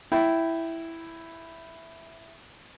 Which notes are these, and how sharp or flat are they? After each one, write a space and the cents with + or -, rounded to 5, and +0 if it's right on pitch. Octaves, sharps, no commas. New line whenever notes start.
E4 +0 G5 -15